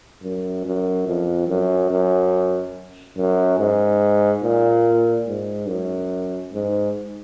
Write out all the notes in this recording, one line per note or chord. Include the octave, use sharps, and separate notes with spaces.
F#2
F#2
F2
F#2
F#2
F#2
G#2
A#2
G#2
F#2
G#2